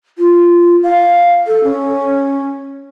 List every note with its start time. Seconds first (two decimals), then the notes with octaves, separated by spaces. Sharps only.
0.18 F4
0.83 F5
1.47 A4
1.64 C#4